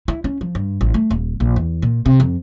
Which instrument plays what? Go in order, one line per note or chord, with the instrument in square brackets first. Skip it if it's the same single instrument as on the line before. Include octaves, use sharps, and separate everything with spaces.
[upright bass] E4
C#4
F3
G2
A1
A3
D#1
A#1
E2
A#2
C3
F2